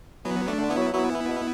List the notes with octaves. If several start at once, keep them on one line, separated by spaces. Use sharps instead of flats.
E3 F#3 B3
A3 D4
D3
B3 E4
F#3
F#3 B3 E4
E3
B2